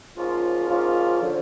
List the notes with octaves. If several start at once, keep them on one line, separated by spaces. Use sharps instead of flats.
G#2 F3 A#3 C#4 F4
G#2 F3 A#3 C#4 F4
D3 F3